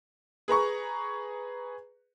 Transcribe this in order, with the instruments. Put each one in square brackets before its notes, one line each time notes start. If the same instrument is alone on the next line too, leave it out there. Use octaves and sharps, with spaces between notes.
[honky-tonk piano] G#4 B4 A#5 C#6